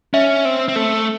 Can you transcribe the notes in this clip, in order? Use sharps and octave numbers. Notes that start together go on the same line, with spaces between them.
C#4 E5
C4
C4
A3